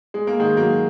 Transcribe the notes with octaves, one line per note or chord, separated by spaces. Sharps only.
G#3
A#3
D#3 G#3
F#3 A#3